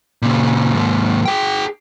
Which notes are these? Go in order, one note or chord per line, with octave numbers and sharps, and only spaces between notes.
A#2 C#3
D#2 G#2
G#4 G5